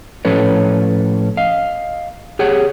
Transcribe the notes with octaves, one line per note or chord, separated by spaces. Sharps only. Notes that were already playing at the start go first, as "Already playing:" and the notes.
A2 F3 C#4 A4 B4 C#5
D#5 F5
G4 G#4 C#5 F#5